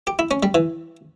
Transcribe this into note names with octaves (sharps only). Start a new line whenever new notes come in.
G4
E4
C#4
G3
E3